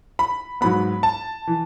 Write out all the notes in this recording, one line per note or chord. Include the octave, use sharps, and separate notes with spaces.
B5
G#2 F#3 B3 B5
A5
E3